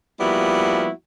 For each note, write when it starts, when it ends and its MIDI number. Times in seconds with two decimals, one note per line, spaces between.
0.20 0.90 53
0.20 0.90 55
0.20 0.90 58
0.20 0.90 59
0.20 0.90 64
0.20 0.90 66